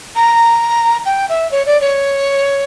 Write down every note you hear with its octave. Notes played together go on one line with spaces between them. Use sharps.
A#5
G5
E5
C#5
D5
C#5